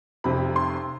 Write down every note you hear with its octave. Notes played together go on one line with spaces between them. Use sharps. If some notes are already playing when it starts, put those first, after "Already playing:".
F1 F2 C3 B5
C6